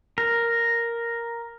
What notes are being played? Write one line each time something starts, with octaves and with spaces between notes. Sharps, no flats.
A#4